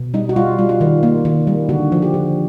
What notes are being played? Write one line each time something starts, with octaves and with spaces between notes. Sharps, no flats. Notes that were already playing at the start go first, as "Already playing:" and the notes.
Already playing: B2
G3 D#4
F#4
G3 F4
G3
F4
D#3
A#3
D#3
G3
D3 F#4
F3
G4
D3